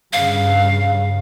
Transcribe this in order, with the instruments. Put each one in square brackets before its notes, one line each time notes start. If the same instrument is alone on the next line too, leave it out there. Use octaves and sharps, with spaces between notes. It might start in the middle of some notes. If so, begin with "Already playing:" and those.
[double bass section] G2 C#3 [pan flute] F5